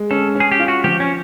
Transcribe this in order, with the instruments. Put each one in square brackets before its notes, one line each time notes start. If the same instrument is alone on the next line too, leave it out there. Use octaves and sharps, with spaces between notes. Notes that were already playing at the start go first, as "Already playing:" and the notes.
Already playing: [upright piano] G#3
[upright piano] C#4 [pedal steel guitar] A4
[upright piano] C#4
[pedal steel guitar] G#4
G4
[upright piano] F4
[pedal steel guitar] F#4
[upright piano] F3 [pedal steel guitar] G4
[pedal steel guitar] C#4